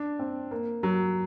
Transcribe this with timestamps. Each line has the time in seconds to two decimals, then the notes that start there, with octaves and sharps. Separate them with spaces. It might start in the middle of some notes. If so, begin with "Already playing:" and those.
Already playing: D4
0.19 C4
0.51 A#3
0.83 F#3